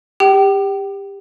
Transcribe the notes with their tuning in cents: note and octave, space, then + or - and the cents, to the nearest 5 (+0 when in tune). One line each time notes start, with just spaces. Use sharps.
G4 +25 G5 -30